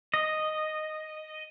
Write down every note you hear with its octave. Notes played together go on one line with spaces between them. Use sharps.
D#5